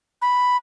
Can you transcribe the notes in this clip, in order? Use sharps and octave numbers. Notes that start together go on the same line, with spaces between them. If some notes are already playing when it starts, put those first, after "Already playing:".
B5